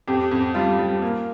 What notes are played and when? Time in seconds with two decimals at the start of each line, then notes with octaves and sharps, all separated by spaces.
0.07 F2 G4
0.31 F2
0.54 G3 F4
0.79 G3
1.02 A#3